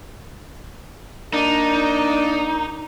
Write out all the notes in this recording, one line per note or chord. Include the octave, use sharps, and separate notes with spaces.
A#3 D4 D#4